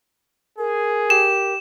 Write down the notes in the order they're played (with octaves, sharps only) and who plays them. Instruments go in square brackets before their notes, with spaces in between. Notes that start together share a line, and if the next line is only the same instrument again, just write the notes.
[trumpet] G#4 [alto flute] A#4
[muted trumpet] G4 [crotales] E7